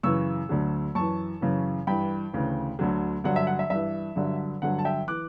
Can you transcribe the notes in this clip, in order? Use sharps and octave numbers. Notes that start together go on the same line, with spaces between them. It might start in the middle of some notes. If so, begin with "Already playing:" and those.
F#2 C#3 E3 C#6 E6
D2 D3 F#3
F#2 E3 A5 C#6
F#2 C#3 E3
G2 E3 G5 B5
D2 C#3 E3
D2 D3 F#3
G2 D3 F#3 F#5
E5
F#5
E5
G2 E3 E5
G2 D3 F#3
G2 D3 F#3 F#5
A5
E5 G5
E3 D6 F#6